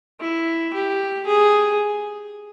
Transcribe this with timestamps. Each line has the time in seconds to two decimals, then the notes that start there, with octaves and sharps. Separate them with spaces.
0.20 E4
0.73 G4
1.27 G#4